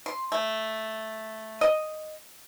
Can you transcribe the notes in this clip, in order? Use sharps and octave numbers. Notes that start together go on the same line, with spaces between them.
C6
A3
D#5